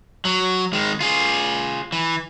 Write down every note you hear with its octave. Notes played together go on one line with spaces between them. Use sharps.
F#3
D#3 G#3
F4 G#4
E3